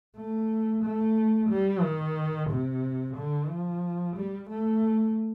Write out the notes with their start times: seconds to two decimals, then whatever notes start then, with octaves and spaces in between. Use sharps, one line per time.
0.17 A3
0.83 A3
1.50 G3
1.83 D#3
2.50 C3
3.17 D3
3.50 F3
4.16 G3
4.50 A3